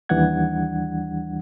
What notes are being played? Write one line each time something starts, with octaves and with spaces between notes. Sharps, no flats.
D#2 E3 G3 D4 F#5 G#6